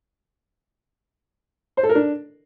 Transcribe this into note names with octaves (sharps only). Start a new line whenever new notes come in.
C5
A4
A#4
D4